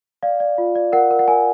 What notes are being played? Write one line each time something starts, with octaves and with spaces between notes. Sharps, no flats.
D5 F5
D5
F4
D5
A#4 F#5
A#4
F#5
A#4 G#5